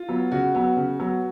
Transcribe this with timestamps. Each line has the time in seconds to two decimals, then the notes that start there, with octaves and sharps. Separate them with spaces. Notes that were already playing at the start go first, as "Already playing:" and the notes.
Already playing: F4
0.09 F#3 B3
0.32 C#3 F#4
0.55 F#3 B3
0.77 C#3
1.00 F#3 B3